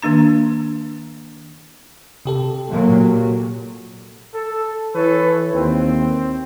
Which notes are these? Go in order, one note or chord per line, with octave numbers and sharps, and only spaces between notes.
D#3 A#3 D4 A#5
C3 G4 A4
A#2 F#3
A4
E3 A4 B4 C#5
D#2 C4